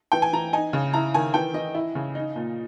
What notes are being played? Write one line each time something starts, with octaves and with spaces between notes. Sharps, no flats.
E3 G5
G#5
E3 A#5
D#4 G#5
C#3
E4 A#5
D#3 G#5
E3 G5
E3 D#5
E4
C#3
D#4
A#2